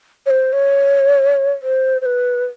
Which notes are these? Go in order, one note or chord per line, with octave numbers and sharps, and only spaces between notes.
C#5
C5
C#5
C5
C5
B4